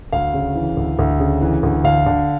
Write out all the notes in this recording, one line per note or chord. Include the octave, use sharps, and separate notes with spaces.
D2 F5
C#3
E3
D2
D2
C#3
E3
D2
D3 F5
D3